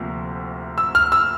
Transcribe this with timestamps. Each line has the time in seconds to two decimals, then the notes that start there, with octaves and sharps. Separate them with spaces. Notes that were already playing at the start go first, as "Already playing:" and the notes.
Already playing: D2 C3 F3 A#3
0.78 E6
0.95 F6
1.12 E6